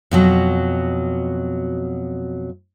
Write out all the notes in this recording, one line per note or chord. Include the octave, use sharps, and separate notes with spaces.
F2 B2 F#3